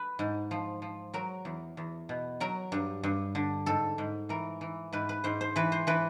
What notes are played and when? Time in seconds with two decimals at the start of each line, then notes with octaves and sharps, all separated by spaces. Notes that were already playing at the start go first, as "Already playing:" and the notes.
Already playing: B4
0.19 G#2
0.51 F3
0.82 F3
1.14 F#3 A#4
1.45 E2
1.77 E2
2.09 B2
2.40 F#3 A#4
2.72 G2
3.03 G2
3.35 D3
3.66 G#2 A4
3.98 G#2
4.29 E3 A#4
4.61 E3
4.93 G#2 B4
5.09 B4
5.24 G#2 C5
5.41 C5
5.56 E3 B4
5.72 C5
5.87 E3 B4